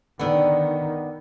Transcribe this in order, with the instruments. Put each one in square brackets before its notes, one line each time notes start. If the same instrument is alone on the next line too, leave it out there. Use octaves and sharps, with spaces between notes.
[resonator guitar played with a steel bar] D3 B3 [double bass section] D#3